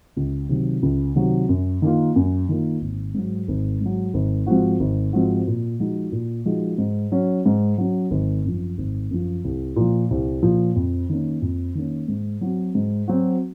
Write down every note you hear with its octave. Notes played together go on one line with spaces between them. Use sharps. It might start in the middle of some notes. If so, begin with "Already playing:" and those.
C#2
C3 D#3 F#3
C#2
C3 D#3 F#3
F#2
D#3 A#3 F4
F#2
D#3 A#3 F4
G#1
G#2 F#3
G#1
G#2 F#3
G#1
G#2 F3 C4 F#4
G#1
G#2 F3 C4 F#4
A#2
F3 G#3 D#4 F#4
A#2
F3 G#3 D#4 F#4
G#2
F#3 C#4
G#2
F#3 C#4
G#1
F#2 F3
G#1
F#2 F3
C2
A#2 F3
C2
A#2 F3
F2
D#3 A#3 C#4
F2
D#3 A#3 C#4
G#2
F#3 C4 F#4
G#2
F#3 C4 F#4